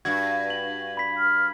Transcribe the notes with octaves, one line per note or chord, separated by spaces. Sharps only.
G2 F#4 G#6
F#7
B5 B6
F6